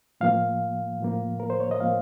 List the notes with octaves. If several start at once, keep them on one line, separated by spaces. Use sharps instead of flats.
A2 F3 A#3 F5
A2 F3 A#3
A#4
C5
C#5
D#5
A2 F3 A#3 F5